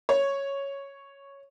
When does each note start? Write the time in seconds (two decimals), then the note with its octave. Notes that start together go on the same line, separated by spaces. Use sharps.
0.09 C#5